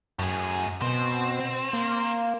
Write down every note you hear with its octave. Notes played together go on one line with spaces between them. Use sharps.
F#2 A2 G#4
B2 C4
A#3